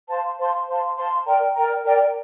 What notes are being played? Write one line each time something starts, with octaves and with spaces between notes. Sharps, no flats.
C5 F5 A5 C6
C5 F5 A5 C6
C5 F5 A5 C6
C5 F5 A5 C6
A#4 D5 G5 A#5
A#4 D5 G5 A#5
A#4 D5 G5 A#5